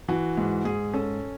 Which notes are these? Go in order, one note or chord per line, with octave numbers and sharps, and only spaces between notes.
E3 F#4
G#2
G#2 G#4
C#4 A4